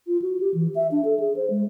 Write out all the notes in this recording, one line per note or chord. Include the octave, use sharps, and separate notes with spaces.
F4
F#4
G4
E3
E5
D4
A4
G#4
C5
G#3